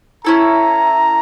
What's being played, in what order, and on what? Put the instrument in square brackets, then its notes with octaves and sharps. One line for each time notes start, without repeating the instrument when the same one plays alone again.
[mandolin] C#4 E4 A4 [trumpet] A#5